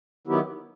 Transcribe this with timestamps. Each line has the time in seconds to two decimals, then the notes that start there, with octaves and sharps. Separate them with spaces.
0.27 D#3 F#3 B3 E4 G4